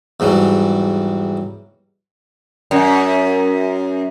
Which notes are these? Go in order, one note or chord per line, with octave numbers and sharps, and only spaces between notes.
E2 G#2 F#3 G3
F#2